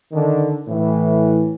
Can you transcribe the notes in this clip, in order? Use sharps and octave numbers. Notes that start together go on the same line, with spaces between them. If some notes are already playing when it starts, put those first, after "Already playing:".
D3 D#3 D4
A2 E3